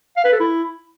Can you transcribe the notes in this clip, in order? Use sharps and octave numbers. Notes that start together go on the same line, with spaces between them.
F5
B4
A4
E4